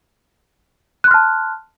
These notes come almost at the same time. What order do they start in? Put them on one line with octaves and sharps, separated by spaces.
F#6 C6 F6 A5